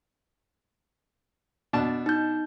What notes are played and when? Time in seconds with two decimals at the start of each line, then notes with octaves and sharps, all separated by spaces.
1.73 B2 D4 A5
2.06 D#4 G6